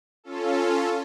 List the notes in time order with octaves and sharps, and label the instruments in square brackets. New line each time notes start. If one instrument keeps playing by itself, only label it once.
[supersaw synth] C#4 F4 A4